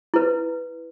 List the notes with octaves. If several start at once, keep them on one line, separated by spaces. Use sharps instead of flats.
E4 B4